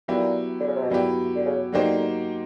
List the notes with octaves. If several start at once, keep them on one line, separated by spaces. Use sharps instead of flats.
A#2 F#3 B3 E4 G4
D3
C#3
C3
B2
A#2 F#3 B3 E4 G4
D3
C#3
D3 F#3 A#3 D#4 G4 C5